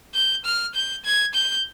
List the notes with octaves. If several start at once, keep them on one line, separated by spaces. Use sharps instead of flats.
G6
F6
G6
G#6
G6